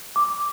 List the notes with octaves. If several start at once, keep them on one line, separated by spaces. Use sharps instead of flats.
D6